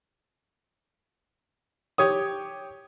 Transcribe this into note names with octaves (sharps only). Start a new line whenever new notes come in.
G4 C#5 D#6